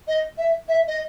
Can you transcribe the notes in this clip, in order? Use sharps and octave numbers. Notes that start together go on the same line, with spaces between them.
D#5
E5
E5
D#5